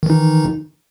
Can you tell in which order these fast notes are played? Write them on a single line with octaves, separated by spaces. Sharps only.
D#3 E3 D#4